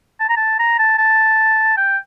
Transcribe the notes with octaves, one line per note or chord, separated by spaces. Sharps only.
A5
A#5
A5
A#5
A5
A5
G5